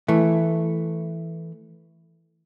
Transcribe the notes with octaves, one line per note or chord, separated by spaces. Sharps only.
E3 A3